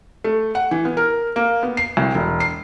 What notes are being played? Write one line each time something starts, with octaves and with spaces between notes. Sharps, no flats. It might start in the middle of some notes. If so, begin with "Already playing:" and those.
A3
F#5
E3
B3
A#4
A#3
B3
C7
C2
E1
C7